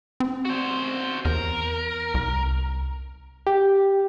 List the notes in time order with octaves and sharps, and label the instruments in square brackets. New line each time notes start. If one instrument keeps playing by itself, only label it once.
[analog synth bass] C4
[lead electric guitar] F#4 C5
[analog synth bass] E2 [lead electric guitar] A#4
[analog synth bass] C2
[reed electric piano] G4